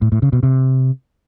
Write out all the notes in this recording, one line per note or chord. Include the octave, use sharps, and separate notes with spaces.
A2
A2
C#3
B2
C3